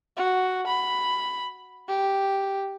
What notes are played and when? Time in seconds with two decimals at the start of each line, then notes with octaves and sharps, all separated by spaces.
0.17 F#4
0.67 B5
1.88 G4